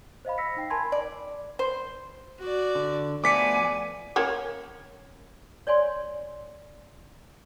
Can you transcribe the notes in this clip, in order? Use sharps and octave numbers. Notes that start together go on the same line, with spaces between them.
C5 D#5 F5 B5
E6 A#6 B6 C#7
D#4 G5 C7
A#4 G#5 A5 B5 C6 G#6
D5
C5
F#4 D5
D3
F3 A3 B3 D5 G#5 D6 B6 C#7
A#3 C#4 C#5
C#5 D5 G#5 C6